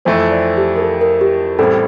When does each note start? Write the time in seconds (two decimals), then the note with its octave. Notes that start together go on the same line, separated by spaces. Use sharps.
0.05 F2 E3 A3 C4 E4 C5
0.31 D5
0.57 G4
0.76 A#4
0.82 A4
1.01 A#4
1.21 G4
1.59 A1 A2 G3 C4 A4